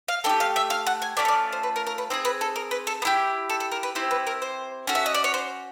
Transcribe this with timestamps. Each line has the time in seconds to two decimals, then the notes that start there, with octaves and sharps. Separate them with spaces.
0.08 F5
0.24 A3 D4 G5
0.29 G4
0.40 F5
0.56 E5
0.70 F5
0.87 F#5
1.02 G#5
1.17 A3 C#4 F4 D5
1.25 C#5
1.28 D5
1.52 C5
1.63 B4
1.76 A#4
1.87 A#4
1.98 B4
2.10 C4 E4 G#4 C5
2.25 B4
2.41 A4
2.56 A#4
2.71 B4
2.87 A4
3.02 B3
3.05 E4 G4
3.50 A4
3.60 A4
3.72 A#4
3.83 B4
3.95 C4 E4 G4 C5
4.11 B4
4.27 A#4
4.42 C5
4.87 C#4 F#4 A4
4.95 E5
5.06 D#5
5.15 D5
5.24 C#5
5.34 C5